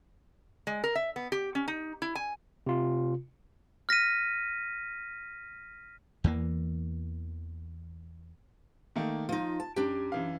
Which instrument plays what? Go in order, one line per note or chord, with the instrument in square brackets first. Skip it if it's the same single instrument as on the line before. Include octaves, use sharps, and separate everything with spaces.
[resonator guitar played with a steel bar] G#3
A#4
E5
B3
G4
C#4
D#4
E4
G#5
[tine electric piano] C3 F4
[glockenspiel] F6 A#6 B6 D#7
[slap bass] E2 E3 A#3
[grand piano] D#3 A3 A#3
[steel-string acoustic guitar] F3 D#4 [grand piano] F4
[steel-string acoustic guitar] A5
[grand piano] F#2 [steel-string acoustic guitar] D4 G4
[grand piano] F#2 E3 F5